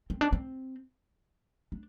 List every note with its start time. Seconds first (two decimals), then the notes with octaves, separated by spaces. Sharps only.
0.10 C4
0.21 D4
0.33 C4
1.72 D4